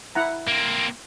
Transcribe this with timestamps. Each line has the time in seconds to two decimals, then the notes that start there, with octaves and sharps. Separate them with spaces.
0.15 E4 F#5 A#5
0.48 A#3 C4